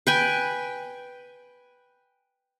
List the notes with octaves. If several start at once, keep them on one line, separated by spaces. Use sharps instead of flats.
B4 G5 G#5